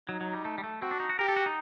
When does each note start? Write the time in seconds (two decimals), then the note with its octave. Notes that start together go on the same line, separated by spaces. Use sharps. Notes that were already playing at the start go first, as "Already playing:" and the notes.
0.09 F#3 D#4
0.21 F#3
0.33 G3
0.45 A3
0.58 G3
0.64 A3
0.82 C4 F#4
0.91 D4
1.00 D#4
1.09 F#4
1.19 G4 A#4
1.28 A4
1.36 F#4
1.46 D#4